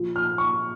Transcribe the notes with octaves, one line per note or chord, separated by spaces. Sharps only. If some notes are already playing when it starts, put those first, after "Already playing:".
Already playing: A#2 F3
F6
C#6